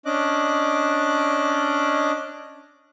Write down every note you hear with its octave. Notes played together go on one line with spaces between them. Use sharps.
C#4 D4 D#5 D6 F#6